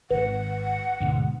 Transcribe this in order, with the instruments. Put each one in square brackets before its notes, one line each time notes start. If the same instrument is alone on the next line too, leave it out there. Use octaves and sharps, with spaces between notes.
[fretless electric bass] G#1 [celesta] B4 [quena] F#5
[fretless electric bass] D2 G#2 B2